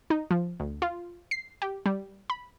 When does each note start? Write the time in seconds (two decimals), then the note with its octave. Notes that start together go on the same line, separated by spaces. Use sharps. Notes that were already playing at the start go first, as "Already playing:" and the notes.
0.10 D#4
0.31 F3
0.60 D2
0.82 F4
1.31 C7
1.62 G4
1.86 G3
2.30 B5